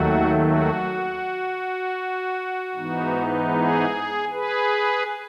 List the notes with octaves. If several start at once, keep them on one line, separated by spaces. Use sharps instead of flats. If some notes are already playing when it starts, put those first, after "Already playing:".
Already playing: D#2 D#3 F#3 A3 F#4
F#4
G#2 E3 B3 D#4
G#4
G#4 B4